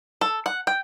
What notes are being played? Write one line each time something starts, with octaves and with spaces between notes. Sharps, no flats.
A4
F#5
G5